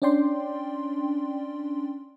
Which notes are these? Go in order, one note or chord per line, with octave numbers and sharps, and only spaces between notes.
C#4 D4 D5 G5 C6